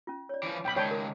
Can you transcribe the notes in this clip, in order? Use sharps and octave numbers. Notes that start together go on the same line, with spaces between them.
C#4 F4
C#5 D5
E3 F3
B1 G5 B5
C#2 D#3 C#5 D5 G5 A5
A#4